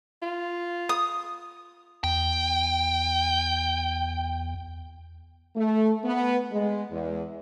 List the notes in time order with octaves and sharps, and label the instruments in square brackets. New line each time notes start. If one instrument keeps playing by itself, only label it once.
[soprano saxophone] F4
[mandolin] D#6
[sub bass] E2 [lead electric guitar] G5
[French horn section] A3
B3
G#3
E2